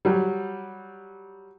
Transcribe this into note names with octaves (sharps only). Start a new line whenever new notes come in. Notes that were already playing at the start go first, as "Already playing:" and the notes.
F#3 G3